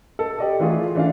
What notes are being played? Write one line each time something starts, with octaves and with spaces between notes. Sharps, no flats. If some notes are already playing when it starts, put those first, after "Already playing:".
A4
G4 D5 D#5
E3 A3 F4 G#4
E3 D4 F5